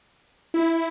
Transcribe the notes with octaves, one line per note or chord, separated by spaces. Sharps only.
E4